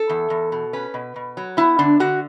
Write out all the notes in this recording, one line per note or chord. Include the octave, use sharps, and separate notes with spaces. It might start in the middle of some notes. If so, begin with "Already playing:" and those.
Already playing: A4
E2
E2
B2
C#4 B4
B2
B2
F#3
B3 E4
D3 D4
D3 F#4